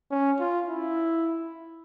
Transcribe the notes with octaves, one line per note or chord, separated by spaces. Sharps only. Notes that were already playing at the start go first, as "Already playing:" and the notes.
C#4
F4
E4